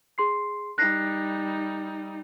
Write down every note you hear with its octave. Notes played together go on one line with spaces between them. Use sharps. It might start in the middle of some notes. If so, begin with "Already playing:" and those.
G#4 C6 C7
G3 D#4 F#6 A#6 C7